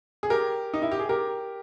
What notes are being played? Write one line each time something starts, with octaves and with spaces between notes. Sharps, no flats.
G#4
G4 A#4
D#4
E4
G4
G#4
G4 A#4